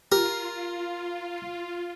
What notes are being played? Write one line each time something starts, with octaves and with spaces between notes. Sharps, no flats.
F4 G4 A#4